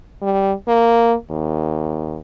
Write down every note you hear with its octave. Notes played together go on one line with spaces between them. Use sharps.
G3
A#3
D#2